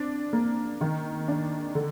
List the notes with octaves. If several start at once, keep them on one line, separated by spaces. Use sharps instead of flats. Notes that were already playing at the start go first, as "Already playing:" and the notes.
Already playing: C4 D4
A#3
D#3
D4
D3